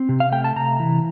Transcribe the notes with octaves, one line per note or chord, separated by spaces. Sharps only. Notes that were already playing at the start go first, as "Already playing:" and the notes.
Already playing: C4
C3
F5
A3 G5
A5
C3 A#5
E3